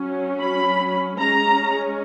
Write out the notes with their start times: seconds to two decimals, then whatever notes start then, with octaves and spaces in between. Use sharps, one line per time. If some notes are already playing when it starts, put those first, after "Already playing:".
Already playing: F#3 C#4
0.40 B5
1.18 G#3 C#4 A#5